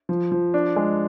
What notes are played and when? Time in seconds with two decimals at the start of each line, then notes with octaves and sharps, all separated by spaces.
0.09 F3
0.32 F3
0.54 D4
0.76 G#3